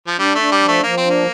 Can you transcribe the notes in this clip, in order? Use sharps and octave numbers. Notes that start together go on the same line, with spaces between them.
F3
G3 D4
A3 D4
G3
F3
A3
F3 A#3
C4
A#3 D4